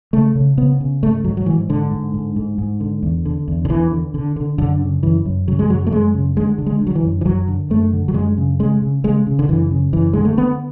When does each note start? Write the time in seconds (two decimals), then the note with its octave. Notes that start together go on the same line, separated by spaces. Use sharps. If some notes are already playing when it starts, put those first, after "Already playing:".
0.13 C#3 A3
0.35 C#3
0.57 C#3 B3
0.80 C#3
1.02 G#2 A3
1.24 G#2 F#3
1.37 F#3
1.46 G#2 E3
1.69 G#2 D3
1.91 G#2
2.14 G#2
2.36 G#2
2.58 G#2
2.80 D3
3.03 E2
3.25 D3
3.48 E2
3.65 D3
3.70 E2 E3
3.91 D3
4.14 D3
4.36 D3
4.58 F#2 D3
4.81 C#3
5.03 F#2 E3
5.25 F#2
5.48 C#3 F#3
5.59 G#3
5.69 F#2 F#3
5.87 A3
5.92 F#2 G#3
6.14 C#3
6.36 D3 G#3
6.58 D3
6.66 G#3
6.82 D3
6.87 F#3
6.95 E3
7.03 F#2
7.21 E3
7.26 F#2 F#3
7.48 D3
7.70 F#2 A3
7.93 D3
8.08 F#3
8.14 F#2 G#3
8.37 C#3
8.59 C#3 G#3
8.82 C#3
9.04 C#3 G#3
9.27 C#3
9.39 D3
9.49 F#2 E3
9.71 C#3
9.93 F#2 E3
10.13 D3 G#3
10.25 A3
10.37 D3 B3